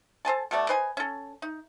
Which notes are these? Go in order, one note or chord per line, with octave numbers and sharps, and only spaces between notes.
A4 C5 G#5 A5
B2 A3 A4 D5
B4 C5 D#5 G#5
C#4 A4
D#4